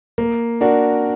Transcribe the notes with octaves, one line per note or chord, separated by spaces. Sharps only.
A#3
D4 F#4 A#4 D5